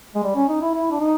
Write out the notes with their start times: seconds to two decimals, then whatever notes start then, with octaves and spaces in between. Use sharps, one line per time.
0.15 G#3
0.23 G3
0.36 C#4
0.49 D#4
0.61 E4
0.74 E4
0.91 D4
1.00 D#4